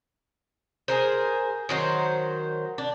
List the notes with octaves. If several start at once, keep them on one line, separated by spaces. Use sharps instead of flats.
G#4 A#4 C5
D#3 F#3 C5
D4